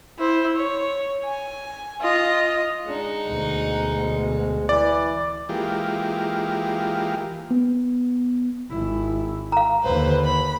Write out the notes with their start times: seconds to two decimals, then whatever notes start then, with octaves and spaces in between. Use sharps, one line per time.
0.19 E4 C5
0.56 C#5
1.24 G#5
2.01 F4 D#5
2.87 G#3 D4 D#4 F#5
3.26 D2 B2
4.69 E3 D5
5.49 E3 G#3 A#3 F4 G4
7.50 B3
8.70 G#1 E4
9.52 F5 A#5
9.84 D#2 D3 B4 C5
10.24 B5